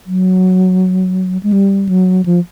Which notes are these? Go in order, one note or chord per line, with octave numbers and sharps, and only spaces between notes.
F#3
G#3
G3
F#3
F3